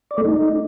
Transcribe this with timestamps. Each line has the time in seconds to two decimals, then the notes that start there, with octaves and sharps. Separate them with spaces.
0.11 D5
0.18 A3
0.25 D#4